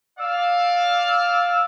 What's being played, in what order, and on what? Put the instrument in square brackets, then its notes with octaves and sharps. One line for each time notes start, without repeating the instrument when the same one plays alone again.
[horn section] D5 F5 [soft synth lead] E6